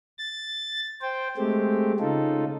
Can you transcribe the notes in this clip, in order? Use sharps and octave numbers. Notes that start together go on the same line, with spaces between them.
A6
C5 G5
G#3 A3 C4 G4
C#3 D#4 F4 A4